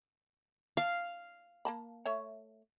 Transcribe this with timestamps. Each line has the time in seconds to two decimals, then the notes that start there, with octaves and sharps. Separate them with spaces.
0.77 D4 F5
1.65 A#3 A5 B5
2.05 A3 C#5 E5